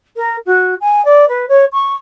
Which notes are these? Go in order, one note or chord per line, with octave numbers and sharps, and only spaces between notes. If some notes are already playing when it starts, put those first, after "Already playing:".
A#4
F#4
G#5
D5
B4
C#5
C#6